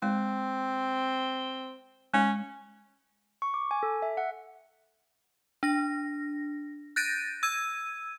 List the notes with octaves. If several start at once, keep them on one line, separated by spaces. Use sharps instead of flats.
G#3 C4
G#3 C#4
C#6
D6
G#5
A4
E5
F#5
D4 A#6
F#6 G6 A6 A#6 D7 D#7
E6 G#6 D#7